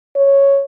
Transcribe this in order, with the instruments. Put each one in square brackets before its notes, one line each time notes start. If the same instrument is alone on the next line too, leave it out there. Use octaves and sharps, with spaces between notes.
[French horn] C#5